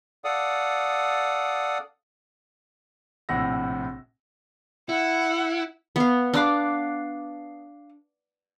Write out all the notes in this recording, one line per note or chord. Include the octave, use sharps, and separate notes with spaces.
A4 D5 F5 F#5 D#6
A#1 A2 C3 F#5 E6 A#6
E4 F#5
B3 F5
D4 F5 D6 F#6